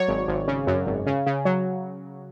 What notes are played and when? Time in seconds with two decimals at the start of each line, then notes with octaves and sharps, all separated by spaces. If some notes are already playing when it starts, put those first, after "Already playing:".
Already playing: F#3 C#5 D5
0.08 G#1
0.28 G#1
0.48 C#3
0.67 F#2
0.86 G#1
1.06 C#3
1.26 C#3
1.45 F#3